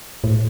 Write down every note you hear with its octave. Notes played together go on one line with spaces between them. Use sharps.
A2